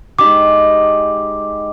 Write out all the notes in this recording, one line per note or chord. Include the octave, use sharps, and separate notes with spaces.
G#3 D#4 G4 D6